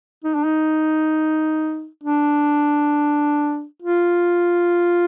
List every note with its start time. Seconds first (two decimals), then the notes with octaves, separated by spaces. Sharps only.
0.24 D#4
0.35 D4
0.45 D#4
2.03 D4
3.82 F4